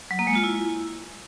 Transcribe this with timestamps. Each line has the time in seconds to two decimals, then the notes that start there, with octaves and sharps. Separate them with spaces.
0.11 F#3
0.19 A#3
0.27 G#3
0.35 F4
0.44 E4